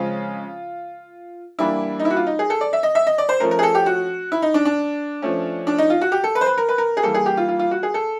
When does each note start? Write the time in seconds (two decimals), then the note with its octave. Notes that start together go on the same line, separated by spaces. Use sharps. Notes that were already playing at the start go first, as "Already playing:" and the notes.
Already playing: C#3 F3 G#3 C4 F4
1.59 E3 G3 A#3 D4 E4
2.00 D#4
2.05 E4
2.10 F#4
2.16 F4
2.27 D#4
2.39 G#4
2.50 A4
2.61 D5
2.73 E5
2.83 D#5
2.95 E5
3.07 D#5
3.18 D5
3.29 C5
3.40 F3 A3 C#4 A#4
3.51 A#4
3.59 G#4
3.63 A4
3.75 G4
3.86 F#4
4.32 E4
4.42 D#4
4.54 D4
4.65 D4
5.22 F3 A3 C#4
5.67 D4
5.78 D#4
5.90 F4
6.01 F#4
6.12 G4
6.24 A4
6.35 B4
6.41 C5
6.46 B4
6.58 A#4
6.69 B4
6.78 A#4
6.97 G#4
7.02 E3 G3 A#3 A4
7.14 G#4
7.26 G4
7.37 F4
7.48 F4
7.59 F4
7.71 F#4
7.83 G#4
7.94 A4